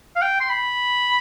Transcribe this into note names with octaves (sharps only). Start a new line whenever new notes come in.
F5
G5
C6
B5